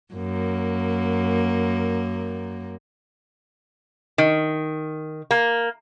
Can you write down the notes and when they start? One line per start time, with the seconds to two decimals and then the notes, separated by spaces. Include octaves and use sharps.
0.14 F#2 A#3
4.18 D#3
5.31 A#3